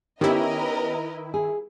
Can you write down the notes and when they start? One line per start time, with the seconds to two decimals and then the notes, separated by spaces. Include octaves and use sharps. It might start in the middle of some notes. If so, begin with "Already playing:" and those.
0.21 D#3 B3 C#4 E4 G4 A#4 B4 D#5
1.34 G#4